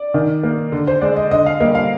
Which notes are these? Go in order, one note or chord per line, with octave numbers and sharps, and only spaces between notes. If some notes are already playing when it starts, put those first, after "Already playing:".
Already playing: D5
D#3
A#3
D3
C5
G#3 D5
D#5
D3 D#5
F5
G3 A#3 D#5
F5